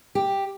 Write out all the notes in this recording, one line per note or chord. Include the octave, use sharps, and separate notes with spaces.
G4